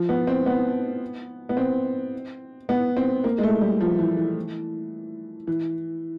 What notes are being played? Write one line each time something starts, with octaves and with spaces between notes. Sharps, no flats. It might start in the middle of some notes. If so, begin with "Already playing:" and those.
Already playing: F3
B3
C4
B3
B3
C4
B3
C4
A#3
G#3
A3
G3
F3
E3
E3
E3